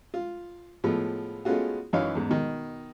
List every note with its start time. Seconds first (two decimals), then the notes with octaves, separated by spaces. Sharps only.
0.14 F4
0.84 A2 F3 G#3 B3
1.45 G#3 A3 B3 C#4 F4 F#4
1.93 F#2 E3 F#3 D#4 C#5 F5
2.15 E2 G#2
2.29 B2 D#3